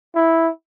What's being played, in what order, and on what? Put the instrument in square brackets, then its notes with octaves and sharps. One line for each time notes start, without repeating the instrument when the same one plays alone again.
[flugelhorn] E4